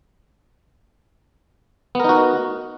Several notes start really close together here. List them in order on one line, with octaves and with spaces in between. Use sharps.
B3 A#4 D#4 F#4